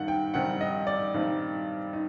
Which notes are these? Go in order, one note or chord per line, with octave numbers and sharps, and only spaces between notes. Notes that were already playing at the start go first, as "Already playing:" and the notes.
Already playing: G2 D#3 G3 D#4 F#5
G5
G2 D#3 G3 C4 D#4 F#5
D#5
D5
G2 D#3 G3 C4 D#4
D#4